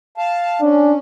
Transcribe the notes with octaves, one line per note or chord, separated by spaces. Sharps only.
F5 A5
C#4 D4